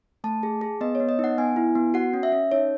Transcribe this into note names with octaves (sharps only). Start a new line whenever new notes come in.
A3 A5
G#4
G#4
B3 D#5
C#5
B3
D#5
D#4 F#5
B3 G#5
E4
B3
F#4 F#5
C#4
E5
C#4
D#4 C#5